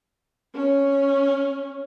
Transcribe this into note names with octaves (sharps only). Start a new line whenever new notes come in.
C#4